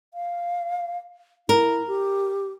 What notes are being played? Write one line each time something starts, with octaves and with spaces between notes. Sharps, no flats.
F5
E4 A#4
G4